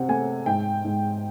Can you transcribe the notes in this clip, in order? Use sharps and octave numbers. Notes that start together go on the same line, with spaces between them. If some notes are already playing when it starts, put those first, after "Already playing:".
Already playing: C3 C4 F#5
A3 G#5
G#2 G5
G#2